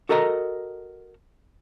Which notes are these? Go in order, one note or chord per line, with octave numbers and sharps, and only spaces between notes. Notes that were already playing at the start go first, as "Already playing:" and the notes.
F#4 A4 A#4 D#5 A#5